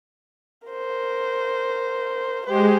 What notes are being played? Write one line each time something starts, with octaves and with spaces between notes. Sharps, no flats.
A#4 C5
G#3 G4 C5